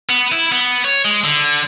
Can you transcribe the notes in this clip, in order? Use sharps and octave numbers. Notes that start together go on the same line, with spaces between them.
B3
E4
B3
C#5
G#3
D3